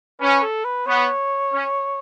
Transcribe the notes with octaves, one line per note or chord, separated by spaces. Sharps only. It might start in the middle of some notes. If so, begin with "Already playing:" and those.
C#4 B4
A4
B4
B3 C#5
C#4